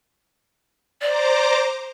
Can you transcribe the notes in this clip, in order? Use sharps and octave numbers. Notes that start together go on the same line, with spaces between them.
C5 D5 A#5 D6